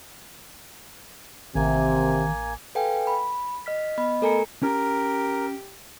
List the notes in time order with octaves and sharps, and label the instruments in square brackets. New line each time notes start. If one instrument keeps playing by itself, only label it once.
[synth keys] A1 [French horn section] C3 [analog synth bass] D#3 [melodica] A#3 G#5
[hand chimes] A4 B4 F5 G5 G#5
B5
D#5 F6 B6
B3 D#5 B5
A3 A4 A#4 G#5 A#5 C#7
[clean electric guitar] C#4 A#5 [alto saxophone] G4 [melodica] A#4